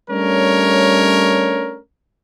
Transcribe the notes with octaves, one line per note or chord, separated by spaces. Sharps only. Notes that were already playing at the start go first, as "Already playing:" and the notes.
G3 A3 C#4 D4 A#4 C#5